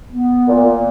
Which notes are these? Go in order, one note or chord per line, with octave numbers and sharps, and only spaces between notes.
B3
A#2